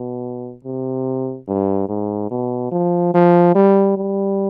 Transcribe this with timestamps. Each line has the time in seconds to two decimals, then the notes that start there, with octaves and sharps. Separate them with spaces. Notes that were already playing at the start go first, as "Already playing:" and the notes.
Already playing: B2
0.64 C3
1.48 G2
1.89 G#2
2.31 B2
2.72 F3
3.14 F3
3.55 G3
3.97 G3